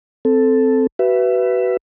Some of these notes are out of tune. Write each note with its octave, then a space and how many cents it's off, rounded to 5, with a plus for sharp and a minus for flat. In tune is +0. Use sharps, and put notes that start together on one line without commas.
C4 -10 A4 +0
F#4 +35 B4 +0 E5 +20